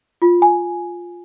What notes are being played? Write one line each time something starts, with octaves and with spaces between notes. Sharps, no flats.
F4
G#5